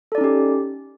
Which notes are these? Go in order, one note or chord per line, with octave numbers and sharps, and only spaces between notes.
C#4 D#4 G4 A4 D5